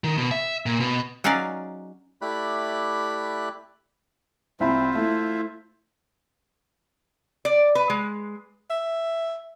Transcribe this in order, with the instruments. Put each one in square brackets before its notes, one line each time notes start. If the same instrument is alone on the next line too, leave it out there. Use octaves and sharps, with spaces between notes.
[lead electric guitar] D#3
B2
E5
A#2
B2
[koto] F#3 C#4 D#4 G#4 D5 F5
[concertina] A3 E4 G4 D5 B5 F#6
[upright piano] C2 E4 B5 [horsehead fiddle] C4 [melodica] F4 C5 E5
[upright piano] A3 [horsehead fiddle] E4
[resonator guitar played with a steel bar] D5
B4
G#3
[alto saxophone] E5